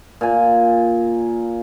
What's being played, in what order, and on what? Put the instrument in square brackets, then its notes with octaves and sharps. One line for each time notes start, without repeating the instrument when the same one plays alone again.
[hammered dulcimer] A#2 G#5